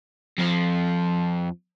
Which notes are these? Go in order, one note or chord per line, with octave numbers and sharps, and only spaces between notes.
F2 F3